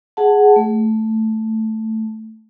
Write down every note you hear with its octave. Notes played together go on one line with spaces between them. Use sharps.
G#4 F#5 A5
A3